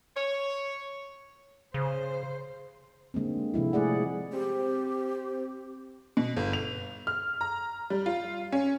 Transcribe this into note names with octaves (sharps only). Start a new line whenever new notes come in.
C#5
C#3 C5
D3 G#3 A#3 C4
C3 F3 G#3 E4
G#3 A3 G#4 D5 F#5
C4 G4
B2
G1
F7
F6
A#5
G3
F4
C#4